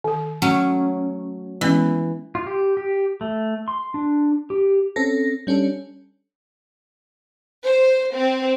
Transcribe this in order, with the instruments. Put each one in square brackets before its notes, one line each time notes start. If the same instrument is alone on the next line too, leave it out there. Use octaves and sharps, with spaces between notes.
[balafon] D#3 A4
[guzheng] F#3 A3 C#4
[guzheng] E3 [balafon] G#3 B3 C#4
[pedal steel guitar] F4
G4
G4
A3
C6
D4
G4
[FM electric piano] C4 C#4 A4 A#6
G3 C#4 D4 A4
[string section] C5
C4